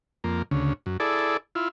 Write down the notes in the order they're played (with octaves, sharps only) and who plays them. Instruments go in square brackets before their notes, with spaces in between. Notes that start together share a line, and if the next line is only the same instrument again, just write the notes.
[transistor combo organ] F2 A#3
D2 C#3
F#2
E4 G#4 A4 D5
E4 F4